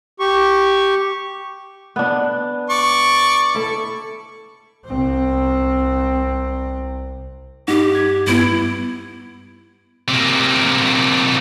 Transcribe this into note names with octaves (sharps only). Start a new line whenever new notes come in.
G4 C#6
B3 D4
D5 C#6
E4 A4
C2 C4
G2 D#4 G4 F#5
G#6
G2 B3 E4
C3 A#3